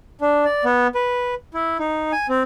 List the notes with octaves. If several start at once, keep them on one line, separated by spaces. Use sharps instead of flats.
D4
D5
B3
B4
E4
D#4
G#5
C4